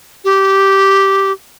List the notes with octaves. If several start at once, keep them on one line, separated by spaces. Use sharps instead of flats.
G4